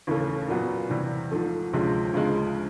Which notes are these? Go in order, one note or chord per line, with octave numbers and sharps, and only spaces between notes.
D#2 C#3 E3 A3 C#4
A#2 F#3 B3
E2 C3 E3 G3
G#2 F3 A3
D2 C3 F3 G#3 C#4
D2 C#3 F3 G#3